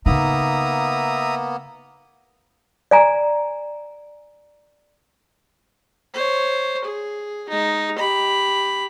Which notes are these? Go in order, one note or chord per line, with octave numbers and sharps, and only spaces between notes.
C#3 A#3 B3 D#4 E5 A#5 D#6
D5 G#5 A#5
C5 C#5
G#4
G#3 D#4
G4 B5